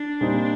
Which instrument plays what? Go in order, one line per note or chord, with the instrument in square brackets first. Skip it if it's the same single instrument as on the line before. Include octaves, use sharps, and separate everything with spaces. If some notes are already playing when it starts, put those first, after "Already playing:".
Already playing: [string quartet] D4
[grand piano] A#2 G3 C4 D#4